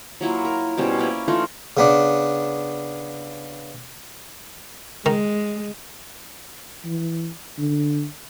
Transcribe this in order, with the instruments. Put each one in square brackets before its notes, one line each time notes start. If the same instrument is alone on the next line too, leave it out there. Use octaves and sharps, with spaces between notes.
[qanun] F#3 A#3 E4 F4
A#4
B2 G3 C#4 C5
A#3 C#4 E4 D5
E3 A3 D#4 F4
[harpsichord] C#3 B3 D4
[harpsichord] D#3 [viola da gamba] G#3
[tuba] E3
D3